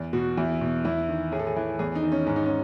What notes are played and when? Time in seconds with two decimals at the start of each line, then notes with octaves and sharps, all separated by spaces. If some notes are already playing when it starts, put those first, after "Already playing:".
Already playing: E2
0.13 B2 F#4
0.37 E2 E4
0.61 B2
0.85 E2 E4
1.09 D#3
1.32 A2 G#4
1.39 A4
1.47 G#4
1.56 E3
1.79 E2 G#4
1.95 D#4
2.03 D#3
2.12 C#4
2.26 G#2 C#4
2.36 D#4
2.46 C#4